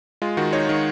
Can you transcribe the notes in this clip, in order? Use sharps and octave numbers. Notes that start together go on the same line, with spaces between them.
G#3 F4
D#3 F#4
D#4 C#5
D#3